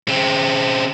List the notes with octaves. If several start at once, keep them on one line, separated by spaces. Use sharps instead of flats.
C#3 C4